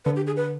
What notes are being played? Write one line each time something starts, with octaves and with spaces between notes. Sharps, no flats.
D3 B4
G4
G#4
B4